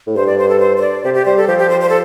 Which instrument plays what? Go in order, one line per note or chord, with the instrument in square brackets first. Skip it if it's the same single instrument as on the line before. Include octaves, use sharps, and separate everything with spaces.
[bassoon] A2
[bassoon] G2 [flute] C5
[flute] D5
C5
A4
C5
C5
D5
[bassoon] C3 [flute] G4
[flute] G4
[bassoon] G3 [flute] C5
[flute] A4
[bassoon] F3 [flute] G4
[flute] G4
C5
C5
A4